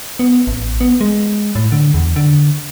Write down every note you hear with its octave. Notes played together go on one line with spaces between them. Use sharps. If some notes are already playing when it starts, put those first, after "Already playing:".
B3
A1
B3
G#3
A2
D3
E2
D3